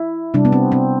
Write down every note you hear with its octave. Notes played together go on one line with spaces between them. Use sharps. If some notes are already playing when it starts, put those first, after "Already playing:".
Already playing: E4
C3 G3 D4
B3
C4
C4